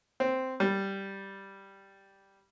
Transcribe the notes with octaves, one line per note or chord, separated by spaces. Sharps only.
C4
G3